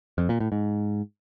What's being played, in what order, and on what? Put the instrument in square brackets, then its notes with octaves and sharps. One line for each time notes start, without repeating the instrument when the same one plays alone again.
[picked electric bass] F2
A#2
A2
G#2